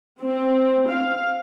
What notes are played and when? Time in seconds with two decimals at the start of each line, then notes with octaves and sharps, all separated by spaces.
0.21 C4
0.90 F5